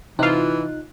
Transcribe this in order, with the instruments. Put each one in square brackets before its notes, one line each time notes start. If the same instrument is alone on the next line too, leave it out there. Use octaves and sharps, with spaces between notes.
[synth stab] C3 F4 [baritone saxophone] E3 [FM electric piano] D#4 F#6